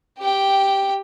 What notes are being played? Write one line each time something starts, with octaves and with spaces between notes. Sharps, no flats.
G4 G5